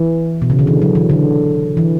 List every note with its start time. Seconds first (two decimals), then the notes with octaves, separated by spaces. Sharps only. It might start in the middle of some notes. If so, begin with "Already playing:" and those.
Already playing: E3
0.42 B2
0.50 C#3
0.59 D3
0.67 E3
0.82 F#3
0.95 E3
1.10 D3
1.77 E3